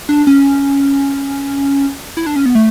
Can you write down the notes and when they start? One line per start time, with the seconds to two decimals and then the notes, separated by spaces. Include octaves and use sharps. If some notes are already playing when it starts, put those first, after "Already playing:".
0.09 D4
0.27 C#4
2.17 E4
2.26 D4
2.36 C#4
2.46 B3
2.55 A3